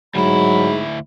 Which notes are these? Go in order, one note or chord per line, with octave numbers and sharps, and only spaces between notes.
D2 G#2 F#3 E4 B5